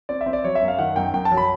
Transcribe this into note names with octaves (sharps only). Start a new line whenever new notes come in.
C4 D5
E5
C4
D5
F#3 C#5
E5
F#2
F5
D#3 F#5
F#2 G5
F#2 G5
A5
F#3
B5